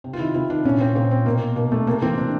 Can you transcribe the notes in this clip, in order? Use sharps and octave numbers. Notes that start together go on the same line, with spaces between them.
C3
F4
D#3 E4
C3 E4
D#3 D4
A#2 C#4
C4
A#2 C4
C4
B2 A#3
B2 A#3
A3
C3 A#3
E3 C4
C3 D4